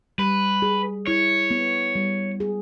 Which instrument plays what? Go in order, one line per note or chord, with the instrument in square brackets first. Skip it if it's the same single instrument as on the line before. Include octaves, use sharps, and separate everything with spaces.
[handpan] G3 [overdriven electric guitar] B4
[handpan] G#4
[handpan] E4 [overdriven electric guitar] C#5
[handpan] B3
G3
G#4